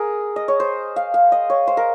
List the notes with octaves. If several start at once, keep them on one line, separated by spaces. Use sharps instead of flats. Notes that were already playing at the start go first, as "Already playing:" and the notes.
Already playing: G#4 A#4
D#5
C#5
C5
F5
F5
D#5
C#5
C5
A#4